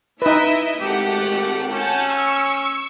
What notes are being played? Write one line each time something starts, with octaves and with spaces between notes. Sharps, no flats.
D#4 E4 B4 D#5 E5
G#1 A3 G4 F#5
C#4 F#5 A5 G6
C#6 E6